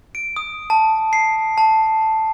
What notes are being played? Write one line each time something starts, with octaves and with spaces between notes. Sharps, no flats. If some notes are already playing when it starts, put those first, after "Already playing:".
D7
D#6
A5
C7
A5